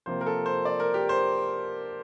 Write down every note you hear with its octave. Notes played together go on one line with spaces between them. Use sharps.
C3 F3 A#3 F4 C5
A#4
A4
C5
D5
A#4
G4
C5